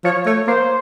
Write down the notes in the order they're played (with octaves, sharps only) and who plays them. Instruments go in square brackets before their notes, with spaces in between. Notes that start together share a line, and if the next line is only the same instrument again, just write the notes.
[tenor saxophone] F3 [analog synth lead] C#5
[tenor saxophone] A3 [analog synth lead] C#5
[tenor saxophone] A#3 [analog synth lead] C5